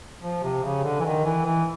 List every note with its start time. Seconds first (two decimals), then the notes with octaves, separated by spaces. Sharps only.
0.22 F3
0.43 C3
0.64 C#3
0.84 D3
1.00 E3
1.05 D#3
1.25 E3
1.45 E3